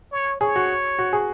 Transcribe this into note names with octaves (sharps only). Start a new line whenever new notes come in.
C#5
G#4 C#5
F#4
F#4
G#4